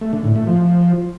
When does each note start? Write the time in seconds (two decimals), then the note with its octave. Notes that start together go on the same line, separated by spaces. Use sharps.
0.01 A3
0.13 D3
0.24 A2
0.36 A3
0.47 F3